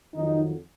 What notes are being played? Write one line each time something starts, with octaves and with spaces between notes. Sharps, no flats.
F2 D#3 F#3 D#4